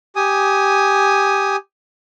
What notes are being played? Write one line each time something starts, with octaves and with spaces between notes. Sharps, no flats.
G4 G#5 D#6